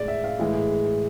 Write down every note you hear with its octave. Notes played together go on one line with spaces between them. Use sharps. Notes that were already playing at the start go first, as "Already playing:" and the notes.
Already playing: A2 G#3 D5
E5
F5
A2 E3 G#3